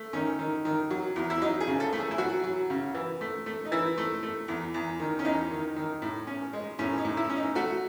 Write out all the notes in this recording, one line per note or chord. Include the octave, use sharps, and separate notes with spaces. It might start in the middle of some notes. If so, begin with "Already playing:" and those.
Already playing: A3
D#3 C#4
D#3
D#3
F#3
E2
E4
F#3 D#4
G#4
C#3
A4
A3
G#4
E4
F#3 F#4
F#3
C#3
E3
A3
A3
D#4
E3 E4
A3
A3
E2
E2
D#3
C#4
E2 D#4
D#3
D#3
A2
C#4
G#3
A2 C#4
D#4
A2
E4
C#4
D#4
A3 F#4